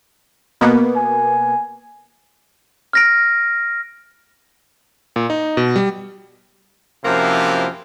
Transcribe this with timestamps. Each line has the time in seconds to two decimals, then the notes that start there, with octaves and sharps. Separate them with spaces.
0.61 B2 A#3 B3
0.96 G#5
2.93 F6 A#6 D7
5.16 A#2
5.30 D#4
5.57 B2
5.76 G3
7.05 F#2 C3 F3 A#3 E4 F4